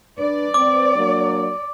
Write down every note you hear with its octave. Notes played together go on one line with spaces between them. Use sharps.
D4 B4 D5
C4 B4 C5 D6
F#3 A#3 D4